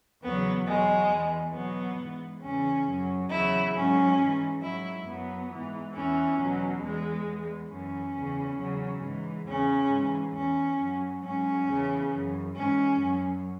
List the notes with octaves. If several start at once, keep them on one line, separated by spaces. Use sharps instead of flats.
E2 C#3 F#3 B3
E2 B2 F#3 G#3
E2 E3
E2 B2 F#3 B3
G#2 E3
E2 C#3 E3 C#4
F#2 F#3
E2 C#3 F#3 E4
G#2 F#3 C#4
G#2 E3
G#2 F#3 E4
F#2 F#3 B3
G#2 E3
E2 E3 C#4
E2 B2 F#3
E2 E3 G#3
E2 E3
F#2 E3 C#4
E2 C#3 E3
E2 C#3 F#3
G#2 E3
E2 C#3 E3 C#4
G#2 E3
E2 E3 C#4
F#2 F#3
G#2 F#3 C#4
E2 C#3 E3
F#2 E3
G#2 E3 C#4
F#2 F#3